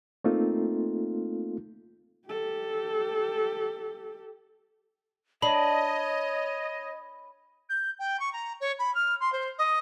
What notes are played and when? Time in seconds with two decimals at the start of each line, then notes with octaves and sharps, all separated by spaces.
0.24 A3 A#3 C4 D#4 F4 A4
2.28 G4 A4
5.42 D4 C#5 D#5 B5
7.69 G6
7.98 G5
8.19 C#6
8.32 A#5
8.60 C#5
8.78 B5
8.94 F6
9.20 C6
9.32 C5
9.58 D#5